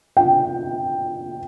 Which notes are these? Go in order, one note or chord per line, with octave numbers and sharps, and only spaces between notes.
G5